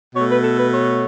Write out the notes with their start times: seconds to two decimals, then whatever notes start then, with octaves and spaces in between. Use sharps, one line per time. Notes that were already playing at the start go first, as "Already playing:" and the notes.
0.16 B2 A3 C#5
0.29 B4
0.43 A4
0.58 B4
0.72 C#5